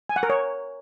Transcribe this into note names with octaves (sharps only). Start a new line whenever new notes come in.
G#5
F#5
A#4
C#5